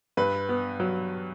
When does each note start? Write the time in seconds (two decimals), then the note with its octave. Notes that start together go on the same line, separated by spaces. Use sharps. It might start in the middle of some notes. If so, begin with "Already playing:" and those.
0.17 G2 B4
0.49 B3
0.80 F#3